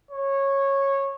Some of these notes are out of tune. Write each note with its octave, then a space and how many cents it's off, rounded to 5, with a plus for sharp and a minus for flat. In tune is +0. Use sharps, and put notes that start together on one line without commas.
C#5 -15